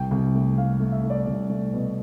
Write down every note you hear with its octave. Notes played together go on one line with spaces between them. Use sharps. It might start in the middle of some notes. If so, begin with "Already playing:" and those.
Already playing: C2 G5
C2
A3
A3 F5
A3
E5
A3
D5
C2
A3
B2